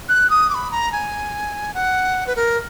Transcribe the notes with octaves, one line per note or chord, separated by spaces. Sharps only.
F#6
D#6
D6
B5
A#5
G#5
F#5
B4
A#4